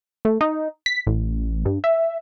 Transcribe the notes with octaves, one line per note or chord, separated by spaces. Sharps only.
A3
D#4
B6
A1
G2
E5